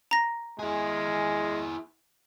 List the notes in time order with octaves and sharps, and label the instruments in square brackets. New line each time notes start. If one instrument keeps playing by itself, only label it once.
[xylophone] A#5 A#6
[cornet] G#3 [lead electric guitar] E4 G#4